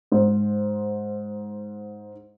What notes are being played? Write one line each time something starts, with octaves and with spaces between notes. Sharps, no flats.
G#2 C5